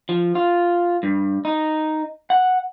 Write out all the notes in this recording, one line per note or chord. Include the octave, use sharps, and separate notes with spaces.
F3
F4
G2
D#4
F#5